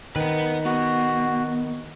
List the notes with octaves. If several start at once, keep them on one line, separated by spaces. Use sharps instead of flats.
D#3 B4 F#5
B3 F#4